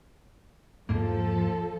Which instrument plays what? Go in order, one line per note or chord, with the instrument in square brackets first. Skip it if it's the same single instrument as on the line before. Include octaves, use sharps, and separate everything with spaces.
[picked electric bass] E2 G#2 A#3 [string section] F3 A4